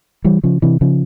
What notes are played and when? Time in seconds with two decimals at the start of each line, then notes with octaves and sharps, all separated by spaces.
0.24 E3 G3
0.44 C#3 F3
0.62 C3 E3
0.81 C#3 F3